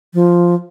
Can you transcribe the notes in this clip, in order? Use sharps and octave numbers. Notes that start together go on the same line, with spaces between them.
F3